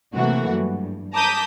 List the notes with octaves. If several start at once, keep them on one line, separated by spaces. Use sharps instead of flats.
C3 E3 F#3 A3 A#3 F#4
G2
A5 A#5 D6 D#6 G6 B6